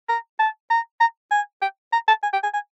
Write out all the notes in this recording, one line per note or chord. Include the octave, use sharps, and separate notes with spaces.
A#5
A5
A#5
A#5
G#5
G5
A#5
A5
G#5
G5
G#5
G#5